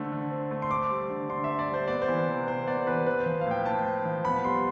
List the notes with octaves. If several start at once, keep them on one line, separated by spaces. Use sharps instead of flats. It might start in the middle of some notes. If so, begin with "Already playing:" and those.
Already playing: D3 A3 C4
D3
C4
A3
C6
C4 D6
G3
D3
D3 C6
E5
C4
D5
G3
C5
B3 D5
C5
E3
C3
C3 C5
B3 D5
E3 B4
C4 B4
C5
F3
F5
A2 G5
A2 A5
C4
F3
B3 B5
G3 C6